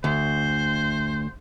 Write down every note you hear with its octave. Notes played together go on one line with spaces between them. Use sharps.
D2 C5